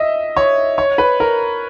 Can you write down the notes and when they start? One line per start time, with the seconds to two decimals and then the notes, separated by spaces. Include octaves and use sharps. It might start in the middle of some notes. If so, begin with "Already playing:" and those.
Already playing: D#5 E5
0.37 C#5
0.78 C#5
0.98 B4
1.20 A#4